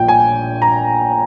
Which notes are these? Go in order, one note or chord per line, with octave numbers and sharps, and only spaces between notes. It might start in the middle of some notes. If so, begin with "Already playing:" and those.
Already playing: A#1 A#2 F3 G5
G#5
A#5